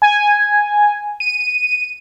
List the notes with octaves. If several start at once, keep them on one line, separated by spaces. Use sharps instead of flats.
G#5
D#7